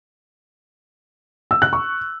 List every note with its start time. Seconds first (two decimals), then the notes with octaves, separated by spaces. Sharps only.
1.51 E6
1.62 F#6
1.73 C#6